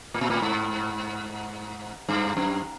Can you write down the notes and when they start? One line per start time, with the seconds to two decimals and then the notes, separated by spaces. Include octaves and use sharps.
0.14 A2
0.21 A#2
0.30 A2
0.42 G#2
2.09 G2
2.37 F#2